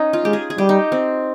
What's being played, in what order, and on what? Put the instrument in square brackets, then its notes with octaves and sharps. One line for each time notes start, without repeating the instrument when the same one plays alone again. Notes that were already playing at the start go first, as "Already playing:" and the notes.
Already playing: [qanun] C#4 D#4
F4
[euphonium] G#3 [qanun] G4
[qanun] G#4
G#4
[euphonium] G3 [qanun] G4
[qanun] D#4
C4